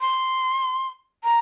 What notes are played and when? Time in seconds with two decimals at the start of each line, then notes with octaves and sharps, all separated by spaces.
0.01 C6
1.24 A#5